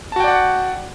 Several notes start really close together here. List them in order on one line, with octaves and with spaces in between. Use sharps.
A5 F#4 G5 D5 F#5